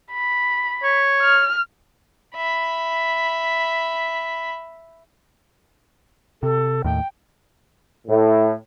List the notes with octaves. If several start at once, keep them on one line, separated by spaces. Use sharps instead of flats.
B5
C#5
F6
E5 B5
C3 A4
D#2 A2 G5
A2